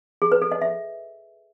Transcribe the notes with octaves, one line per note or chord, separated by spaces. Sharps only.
G#4
B4
A4
D#5
E5